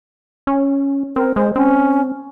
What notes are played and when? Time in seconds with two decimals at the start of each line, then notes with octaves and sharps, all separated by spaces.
0.47 C#4
1.16 C4 A#4
1.36 G#3 C5
1.56 C4 C#4